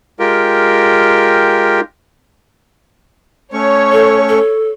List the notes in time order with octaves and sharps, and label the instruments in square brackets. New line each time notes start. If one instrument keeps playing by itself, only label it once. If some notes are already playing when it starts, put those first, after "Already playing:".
[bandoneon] G#3 F4 G4 A#4 G5
[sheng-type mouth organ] A3 C#4 C#6 [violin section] C#5
[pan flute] A4
A4